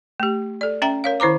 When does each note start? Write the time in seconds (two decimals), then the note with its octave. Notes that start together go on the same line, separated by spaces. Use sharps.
0.20 A3 G4
0.61 A4 D5
0.82 C#4 E5 G5 A#5
1.04 A#4 C#5 F5
1.20 D#3 E4 C5 A#5 D6